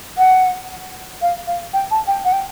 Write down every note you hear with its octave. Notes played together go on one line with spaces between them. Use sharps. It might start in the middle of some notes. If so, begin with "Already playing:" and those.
F#5
F5
F5
G5
A5
G5
F#5
G5